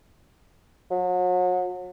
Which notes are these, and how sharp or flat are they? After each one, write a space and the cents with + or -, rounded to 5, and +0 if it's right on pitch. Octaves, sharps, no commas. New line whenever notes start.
F#3 -35